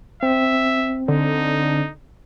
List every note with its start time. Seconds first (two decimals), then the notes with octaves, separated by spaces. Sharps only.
0.23 C4 E5
1.08 D3 D#4